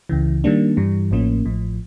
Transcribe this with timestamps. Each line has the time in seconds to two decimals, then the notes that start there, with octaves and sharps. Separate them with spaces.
0.09 C#2 C#3 E3
0.44 D#3 G3 A#3 D4
0.77 G2 E3 G3
1.11 A1 A2 F3 A#3 C#4
1.46 A1 A2 F3